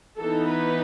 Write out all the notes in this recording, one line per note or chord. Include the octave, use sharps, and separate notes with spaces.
E3 B3 D#4 A4
B4